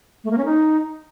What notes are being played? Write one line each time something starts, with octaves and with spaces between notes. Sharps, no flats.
A3
A#3
C#4
D#4